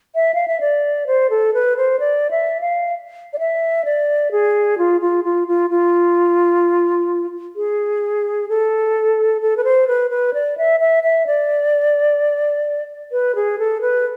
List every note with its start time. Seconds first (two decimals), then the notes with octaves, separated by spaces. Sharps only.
0.15 E5
0.35 F5
0.48 E5
0.61 D5
1.07 C5
1.30 A4
1.54 B4
1.77 C5
2.00 D5
2.31 E5
2.61 F5
3.33 D5
3.39 E5
3.85 D5
4.31 G#4
4.78 F4
5.01 F4
5.24 F4
5.48 F4
5.70 F4
7.56 G#4
8.49 A4
9.42 A4
9.57 B4
9.64 C5
9.88 B4
10.10 B4
10.34 D5
10.58 E5
10.80 E5
11.03 E5
11.27 D5
13.12 B4
13.35 G#4
13.59 A4
13.81 B4